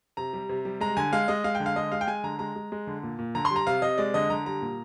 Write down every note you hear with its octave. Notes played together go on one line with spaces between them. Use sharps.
C3 A#5
G3
C3
G3
G#3 A#5
D3 G#5
G#3 F5
G#3 D#5
G#3 F5
G5
D3
F5
G#3 D#5
G#3 F5
G5
G#3 G#5
D3 A#5
G#3 A#5
G#3
G#3
D3
A#2
A#2
D3 A#5
C6
G3 A#5
C3 F5
C3 D#5
G#3 D5
D3 D#5
D3 A#5
G3 A#5
A#2